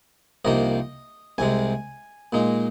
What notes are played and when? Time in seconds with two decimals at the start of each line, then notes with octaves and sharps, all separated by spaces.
0.45 C2 C3 F3 A#3 D#4 D#5
1.38 C2 C3 G#3 G#5
2.33 A#2 G#3 D#4